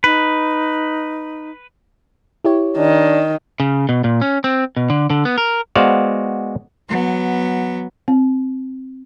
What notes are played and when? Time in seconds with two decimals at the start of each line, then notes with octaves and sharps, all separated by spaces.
0.04 D#4 B4
2.45 E4 G4 C#5
2.78 D#3 D4
3.60 C#3
3.89 B2
4.04 A#2
4.22 C#4
4.44 C4
4.77 B2
4.90 D3
5.10 D3
5.25 B3
5.38 A#4
5.75 G#3 B3 F#4 C5 D5 F5
6.89 F#3 B3
8.08 C4